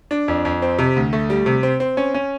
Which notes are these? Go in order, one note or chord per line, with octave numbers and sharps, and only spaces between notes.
D4
F2
F2
C4
C3
D2
A3
G3
C3
C4
C4
C#4
C#4